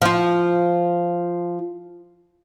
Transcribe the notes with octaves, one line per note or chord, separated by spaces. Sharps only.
F3 F4